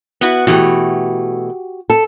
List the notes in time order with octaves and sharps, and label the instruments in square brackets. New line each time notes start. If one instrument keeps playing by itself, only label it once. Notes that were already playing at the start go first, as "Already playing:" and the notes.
[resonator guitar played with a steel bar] B3 E4 F#4
[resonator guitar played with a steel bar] B2 E3 A3 [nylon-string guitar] F#4 G4
[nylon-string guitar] A4